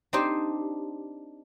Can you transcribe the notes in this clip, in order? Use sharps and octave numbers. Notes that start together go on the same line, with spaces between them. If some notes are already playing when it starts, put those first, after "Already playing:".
C4 D4 D#4 G4 C5